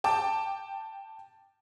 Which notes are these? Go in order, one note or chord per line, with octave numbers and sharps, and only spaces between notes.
G5 A5 D6